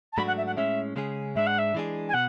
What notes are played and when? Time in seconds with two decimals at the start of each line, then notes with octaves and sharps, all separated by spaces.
0.13 A5
0.17 G#2 F#3 A3 D4 F#4 B5
0.28 F#5
0.37 E5
0.47 F#5
0.56 A2 G#3 C#4 E5
0.96 C#3 G#3 C#4 G#4
1.35 G#2 G#3 D4 E5
1.47 F#5
1.58 E5
1.74 E3 G#3 D4 G#4
2.09 G#5
2.14 B2 F#5